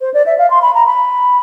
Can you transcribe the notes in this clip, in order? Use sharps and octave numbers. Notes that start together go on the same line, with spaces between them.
C5
D5
E5
F5
C6
B5
A#5
B5